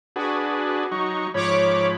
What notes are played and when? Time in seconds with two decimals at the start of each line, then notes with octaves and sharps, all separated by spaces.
0.16 D4 F#4 G#4 B4
0.91 F#3 D#4 C#6
1.34 G#2 F3 C#5 B5 D6